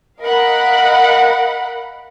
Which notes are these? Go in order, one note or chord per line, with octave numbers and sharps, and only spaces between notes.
A#4 D#5 F5 F#5 B5